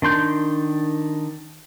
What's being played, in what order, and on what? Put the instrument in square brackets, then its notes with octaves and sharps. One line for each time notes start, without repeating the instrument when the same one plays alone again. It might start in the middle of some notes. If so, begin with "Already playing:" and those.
[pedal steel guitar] D#3 D4 C6 G6